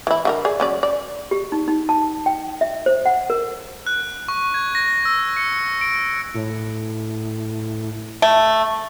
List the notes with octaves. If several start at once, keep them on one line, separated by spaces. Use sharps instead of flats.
E3 E4
D3 F#4 A#4
G#4 D5
F#3 C#4 D5
D5
G4
D#4
D#4
A5
G5
E5
C5
F#5
A#4
F#6
C#6
G#6
A#6
E6
C#7
D7
A2
A3